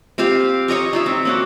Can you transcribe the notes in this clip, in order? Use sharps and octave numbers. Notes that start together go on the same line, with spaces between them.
C4 F4 G4 F5
C#5 D#5 A#5 C#6
D#4 F4 E5
C4
A#3 C#4 F#4